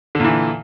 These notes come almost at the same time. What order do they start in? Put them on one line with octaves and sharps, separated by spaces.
D3 A#2 E3